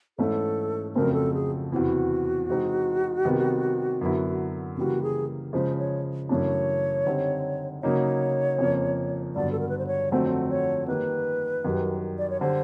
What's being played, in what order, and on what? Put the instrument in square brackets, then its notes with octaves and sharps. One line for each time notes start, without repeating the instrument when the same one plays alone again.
[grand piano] G#2 E3 A3 C#4 E4 [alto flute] A4
[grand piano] F2 C#3 F#3 A3 C4 [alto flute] A#4
[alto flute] A4
G#4
[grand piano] E2 C3 E3 [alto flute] F#4
[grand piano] C3 E3 G#3 C4 D#4
C3 D#3 G3 B3
F#2 D3 F#3 B3 E4
[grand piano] C#3 E3 G3 A#3 [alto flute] F#4
[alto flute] G#4
[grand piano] C#3 F3 G#3 [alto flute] C5
[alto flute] C#5
[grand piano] F#2 C#3 E3 A3 D4 [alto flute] C#5
[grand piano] D3 G3 C4 D#4
[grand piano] C#3 F#3 A#3 D#4 [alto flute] C#5
[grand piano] F2 C#3 F3 A#3
[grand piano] G2 D3 F#3 B3 [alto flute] D5
[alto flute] A4
A#4
B4
C5
C#5
[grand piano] F2 D3 F#3 A3 C4 [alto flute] C5
[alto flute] C#5
[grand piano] D#3 G3 A#3 [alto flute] B4
[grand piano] F#2 D#3 G3
[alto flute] D5
C#5
[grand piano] D3 G3 [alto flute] C5